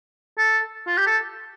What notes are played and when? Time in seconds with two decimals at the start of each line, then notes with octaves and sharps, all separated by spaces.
0.38 A4
0.87 F4
0.97 G4
1.07 A4